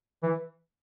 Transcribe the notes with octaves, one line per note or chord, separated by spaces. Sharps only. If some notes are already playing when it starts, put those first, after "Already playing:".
E3